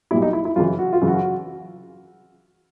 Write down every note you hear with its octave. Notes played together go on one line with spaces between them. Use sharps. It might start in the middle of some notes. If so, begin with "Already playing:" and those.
B1 A#2 G3 E4
D#4
E4
E4
F#2 C#3 E3 F4
F#4
F4
F#2 C#3 E3
F#4